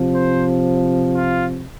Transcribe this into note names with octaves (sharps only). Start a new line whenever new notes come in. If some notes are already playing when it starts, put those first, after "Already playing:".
Already playing: C3 F3
C5
F4